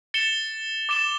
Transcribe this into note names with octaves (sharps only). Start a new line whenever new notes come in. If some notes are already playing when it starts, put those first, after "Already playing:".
A6 C#7 E7 G7
D6 A6 E7 G7